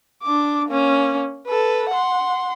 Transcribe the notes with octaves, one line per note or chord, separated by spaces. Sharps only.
D4 D6
A#3 C#4
A4 B4
F#5 C6